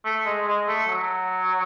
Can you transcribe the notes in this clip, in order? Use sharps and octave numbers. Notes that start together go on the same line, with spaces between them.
A3
G#3
G#3
A3
F#3